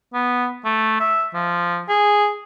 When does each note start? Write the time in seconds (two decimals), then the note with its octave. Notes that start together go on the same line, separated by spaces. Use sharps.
0.14 B3
0.65 A3
1.00 E5
1.34 F3
1.89 G#4